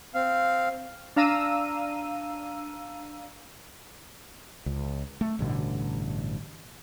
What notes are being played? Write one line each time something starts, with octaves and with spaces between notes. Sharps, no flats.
C4 F5
D4 F5 A#5 E6 D#7
C#2
A3
A1 G2 B2 D3